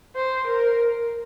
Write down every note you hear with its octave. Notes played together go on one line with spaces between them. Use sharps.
C5
A#4